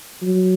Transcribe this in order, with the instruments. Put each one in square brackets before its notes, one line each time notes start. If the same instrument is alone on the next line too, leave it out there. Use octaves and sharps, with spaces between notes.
[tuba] F#3